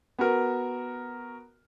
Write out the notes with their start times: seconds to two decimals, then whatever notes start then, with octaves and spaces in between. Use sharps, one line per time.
0.19 B3 F#4 A#4